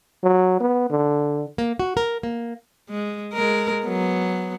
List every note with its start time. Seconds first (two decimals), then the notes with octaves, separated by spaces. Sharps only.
0.23 F#3
0.60 B3
0.90 D3
1.58 A#3
1.79 F#4
1.97 A#4
2.23 A#3
2.89 G#3
3.33 G#3 A#4
3.84 F#3 B3